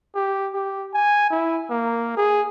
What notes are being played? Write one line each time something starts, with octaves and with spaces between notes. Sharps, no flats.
G4
G4
G#5
E4
A#3
G#4